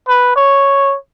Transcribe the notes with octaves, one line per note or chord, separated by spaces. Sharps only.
B4
C#5